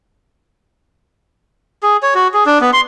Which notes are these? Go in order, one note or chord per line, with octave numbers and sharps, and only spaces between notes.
G#4
C#5
F#4
G#4
D4
B3
C6